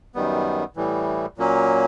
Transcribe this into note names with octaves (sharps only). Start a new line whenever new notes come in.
F#2 D#3 G3 B3
A2 E3 G3
A#2 F#3 A#3 C#4